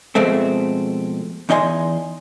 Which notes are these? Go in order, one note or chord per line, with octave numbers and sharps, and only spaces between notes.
F2 B2 G#3 A3 C4
E2 D#4 D#5 G#5 C6